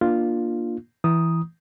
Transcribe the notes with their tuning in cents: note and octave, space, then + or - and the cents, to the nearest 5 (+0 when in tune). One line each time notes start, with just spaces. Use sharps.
A#3 +15 D4 +30 F4 +0
E3 +0 A#5 +15 D#6 +0